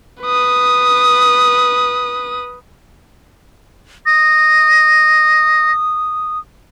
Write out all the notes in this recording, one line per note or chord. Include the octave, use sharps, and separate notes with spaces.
B4 D#6
D#6 A#6